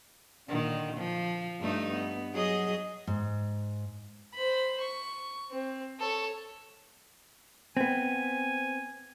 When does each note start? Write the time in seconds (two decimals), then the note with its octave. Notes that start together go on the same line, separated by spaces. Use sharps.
0.48 A#2 D3 D#3
0.97 F3
1.60 G2 A3 D#4
1.93 B3
2.33 F#3 G#4 D#5
3.07 G#2
4.34 C5 B5
4.81 C#6
5.51 C4
6.00 A4 C#5
7.77 B3 C4 G#5